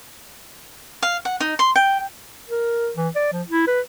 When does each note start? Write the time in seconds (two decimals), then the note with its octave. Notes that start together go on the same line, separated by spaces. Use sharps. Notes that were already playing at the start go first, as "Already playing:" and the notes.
1.02 F5
1.25 F#5
1.40 D#4
1.59 C6
1.76 G5
2.49 A#4
2.96 E3
3.16 D5
3.33 F3
3.48 E4
3.67 B4